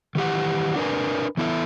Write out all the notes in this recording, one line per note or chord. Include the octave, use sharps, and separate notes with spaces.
D#3 E3 G4 F#5
D4 A#4 B4 G#5
E3 B3 E4 A4 E5